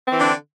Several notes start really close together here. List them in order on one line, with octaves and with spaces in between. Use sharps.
C4 E3 D3 D4